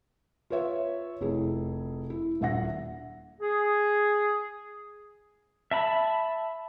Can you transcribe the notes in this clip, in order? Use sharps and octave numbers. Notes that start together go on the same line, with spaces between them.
F4 B4 C#5 E5
F1 E4 G#4
E4
D#1 D4 E5 F#5 A#6
G#4
E5 A5 B5